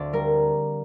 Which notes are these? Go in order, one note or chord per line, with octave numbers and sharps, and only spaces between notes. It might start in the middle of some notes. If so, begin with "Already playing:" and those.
Already playing: D2 C4 D5 F5
G3 A#4